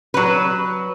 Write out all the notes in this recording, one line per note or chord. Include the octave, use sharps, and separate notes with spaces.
F#3 B4